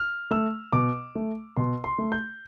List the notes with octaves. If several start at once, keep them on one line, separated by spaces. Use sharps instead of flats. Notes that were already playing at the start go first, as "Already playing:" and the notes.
Already playing: F6
A3 E6
B2 D6
A3
B2 C6
C6
A3
G6